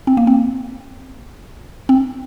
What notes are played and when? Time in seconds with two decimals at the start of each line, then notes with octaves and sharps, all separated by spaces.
0.07 C4
0.17 A#3
0.27 C4
1.89 C4